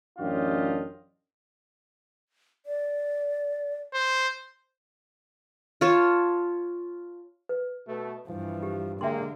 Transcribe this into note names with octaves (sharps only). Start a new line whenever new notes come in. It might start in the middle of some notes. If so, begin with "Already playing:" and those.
A1 F#2 D4 F4 G4 D#5
D5
C5
F4 C#5 A5
B4
B2 A3
G2 E3 F3
G4
D3 F#3 G#3 A#3 E5 G5 C6